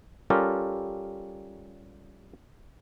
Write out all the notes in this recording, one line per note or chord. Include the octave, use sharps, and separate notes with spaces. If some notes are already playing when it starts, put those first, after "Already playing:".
G3 C#4 F4 G4 A4 A#4